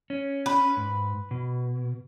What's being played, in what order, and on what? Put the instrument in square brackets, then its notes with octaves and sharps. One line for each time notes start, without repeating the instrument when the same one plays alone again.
[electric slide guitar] C#4
[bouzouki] B4
[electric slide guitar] G#2
B2